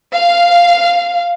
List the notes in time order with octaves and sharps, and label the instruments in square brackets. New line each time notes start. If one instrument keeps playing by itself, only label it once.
[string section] F5